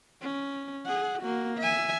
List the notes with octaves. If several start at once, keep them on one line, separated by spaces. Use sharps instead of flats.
C#4
G#4 F#5
A#3 F#4
E5 G#5